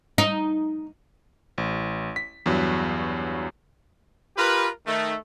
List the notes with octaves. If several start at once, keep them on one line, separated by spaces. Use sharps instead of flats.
D#4
A1
B6
E2 G2 F#3
F4 G4 A#4 B4
D#3 A3